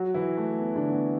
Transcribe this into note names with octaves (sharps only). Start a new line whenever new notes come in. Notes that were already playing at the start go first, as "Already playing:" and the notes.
Already playing: F#3 F#4
E3 E4
A3
B3
D3 D4
B3